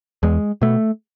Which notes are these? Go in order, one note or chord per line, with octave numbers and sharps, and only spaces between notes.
E2 G#3
B2 A3